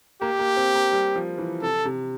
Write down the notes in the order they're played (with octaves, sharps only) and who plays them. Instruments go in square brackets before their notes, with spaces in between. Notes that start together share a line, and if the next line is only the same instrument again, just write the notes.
[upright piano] A#3 [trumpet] G4
[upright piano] A#3
C4
A#3
G3
F3
E3
[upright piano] C3 [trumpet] A4
[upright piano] C3